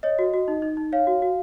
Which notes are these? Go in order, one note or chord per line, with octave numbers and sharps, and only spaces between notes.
C#5 D#5
F#4
F#4
D#4
D#4
D#4
C#5 F5
F#4
F#4